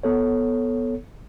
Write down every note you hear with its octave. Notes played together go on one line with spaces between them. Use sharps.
B3 A4 C#5